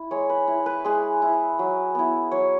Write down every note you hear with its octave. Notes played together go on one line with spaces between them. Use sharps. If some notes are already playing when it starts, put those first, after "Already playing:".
Already playing: E4
G#3 C#5
B4
E4
B4
G#3 G#4
E4
F#3
B3 E4
F#3 C#5